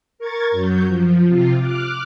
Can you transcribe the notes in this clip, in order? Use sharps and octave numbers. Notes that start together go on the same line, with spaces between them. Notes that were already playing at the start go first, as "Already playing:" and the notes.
A#4 C#6 G#6 A6
F#2 F#3 G6
F3
C3 F4
D6 F6 F#6